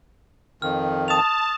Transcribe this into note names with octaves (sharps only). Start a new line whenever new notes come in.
F2 D#3 F6
A5 D#6 F7